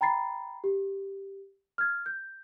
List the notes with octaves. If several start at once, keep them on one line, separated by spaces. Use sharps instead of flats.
G5 A#5 B5 A6 C7
G4
F6 G#6
G6